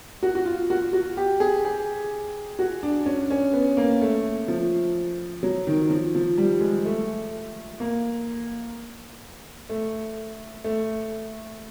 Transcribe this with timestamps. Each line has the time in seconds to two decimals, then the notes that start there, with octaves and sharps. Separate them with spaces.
0.23 F#4
0.35 F#4
0.45 F4
0.70 F#4
0.93 F#4
1.17 G4
1.40 G#4
1.65 G#4
2.59 F#4
2.83 D4
3.06 C#4
3.30 C#4
3.53 B3
3.77 A#3
4.02 A3
4.48 F3
5.43 F#3
5.67 D#3
5.90 F3
6.15 F3
6.38 G3
6.61 G#3
6.85 A3
7.80 A#3
9.69 A3
10.64 A3